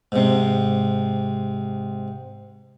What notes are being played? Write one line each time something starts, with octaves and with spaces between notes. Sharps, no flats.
G#2 C3